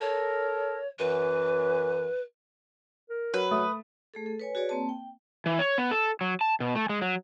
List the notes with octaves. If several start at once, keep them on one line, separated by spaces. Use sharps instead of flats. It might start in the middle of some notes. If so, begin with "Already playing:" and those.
A4 A#4 C#5
F#2 E3 B4
A#4
F#3 B4
A3 D#6
A3 G#4 A4
A4
B4 C#5 G#5
F#4 G#4 B4 C#5 D5
A#3 C4 A5
G5
E3
C#5
B3
A4
F#3
A5
B2
A3
G#3
F#3